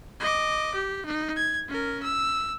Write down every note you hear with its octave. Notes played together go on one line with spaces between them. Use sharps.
D#5 D6
G4
D#4
G#6
C#4 A#4
E6